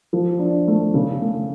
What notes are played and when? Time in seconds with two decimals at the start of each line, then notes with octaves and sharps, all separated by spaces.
0.13 F3
0.39 D4
0.67 A3
0.94 C#3
1.21 A3